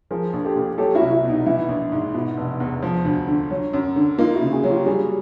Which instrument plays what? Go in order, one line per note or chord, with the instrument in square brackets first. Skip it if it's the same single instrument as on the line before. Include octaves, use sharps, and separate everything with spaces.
[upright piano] F3 [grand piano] G#4 A#4
[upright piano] A#1
[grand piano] G4 A4
[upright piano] A#2
[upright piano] F#3 [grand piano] G4 A4
[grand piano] E4 F#4
[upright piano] C2
[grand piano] E4
[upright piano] B2
[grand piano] D#4
[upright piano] E3 [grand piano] E4
[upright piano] A#1
G#2
[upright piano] B2 [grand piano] E4
[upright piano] F1
E2
F3
D2
D3
F#3
F#2
D3
[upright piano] A#3 [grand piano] D#4 F4
[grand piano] E4 F#4
[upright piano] C#3
[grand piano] F#4 G#4
[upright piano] F#3
[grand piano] F4 G4
[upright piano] G3 [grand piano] F#4 G#4